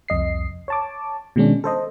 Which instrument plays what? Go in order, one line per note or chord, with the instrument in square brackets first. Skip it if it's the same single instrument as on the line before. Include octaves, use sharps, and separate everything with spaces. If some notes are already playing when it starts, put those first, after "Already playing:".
[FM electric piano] C2 F2 D#5 C7
C#5 A5 D6
B2 D#3 G#3 C#4 D4
A4 C5 D#5